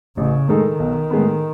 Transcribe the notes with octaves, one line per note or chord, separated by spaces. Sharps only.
A1 C#3
A2 D#3 G#3 D#4 A4
B1
A2 G#3 B3